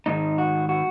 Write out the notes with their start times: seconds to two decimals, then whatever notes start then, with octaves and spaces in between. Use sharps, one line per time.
0.06 G#2 D#3 D#4
0.38 F#4
0.69 F#4